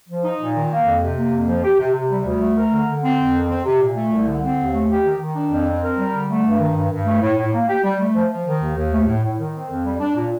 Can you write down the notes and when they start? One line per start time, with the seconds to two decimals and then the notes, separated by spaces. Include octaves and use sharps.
0.09 F3
0.24 D#4
0.40 A#2
0.55 D#3
0.71 A#3
0.86 F2
1.02 C3
1.17 A#3
1.33 F2
1.48 F3
1.64 G4
1.80 C3
1.94 C3
2.11 G3
2.25 D2
2.42 A3
2.56 A#4
2.72 D3
2.88 D3
3.03 C4
3.19 F2
3.35 D#3
3.49 C4
3.65 C3
3.80 A#2
3.96 A3
4.12 C2
4.27 D3
4.43 C4
4.58 D#2
4.74 A3
4.89 G4
5.05 D#3
5.20 D#3
5.35 D4
5.51 F2
5.67 C4
5.82 A#4
5.98 G3
6.14 D3
6.29 A3
6.44 G2
6.59 D#3
6.76 G2
6.91 G2
7.06 A3
7.22 A2
7.38 A2
7.52 A#3
7.68 G4
7.84 G3
7.99 A3
8.15 F3
8.31 F3
8.46 D#3
8.61 D#2
8.77 D#2
8.92 A3
9.07 A2
9.23 A2
9.39 D#3
9.54 C4
9.69 F2
9.85 G3
10.00 D4
10.16 A#2